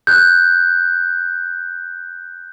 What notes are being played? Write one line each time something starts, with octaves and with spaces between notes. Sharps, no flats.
F#6 G6